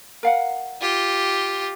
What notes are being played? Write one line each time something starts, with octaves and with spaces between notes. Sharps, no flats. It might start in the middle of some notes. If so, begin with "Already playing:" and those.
A#4 F5 F#5
F4 G4